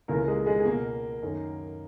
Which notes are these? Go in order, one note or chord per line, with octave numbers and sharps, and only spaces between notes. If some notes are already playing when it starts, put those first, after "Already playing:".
C#2 C#3 E3 A#3 A#4
G#3 G#4
G#3 G#4
G#4
C#2 B2 A#3 A#4
F#2 D#3